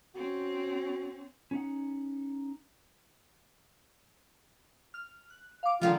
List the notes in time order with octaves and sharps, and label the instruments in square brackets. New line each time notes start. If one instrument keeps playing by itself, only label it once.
[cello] C4 C#4 [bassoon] F#4
[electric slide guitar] C#4 D#4 F#5
[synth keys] F6
F#6
F5 D6
[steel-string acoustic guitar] D3 D#3 G#3 [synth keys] F3 [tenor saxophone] F4